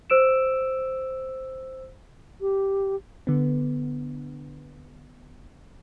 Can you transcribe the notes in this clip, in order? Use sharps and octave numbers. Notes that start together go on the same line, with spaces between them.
C5 E6 D7 E7
G4
D3 B3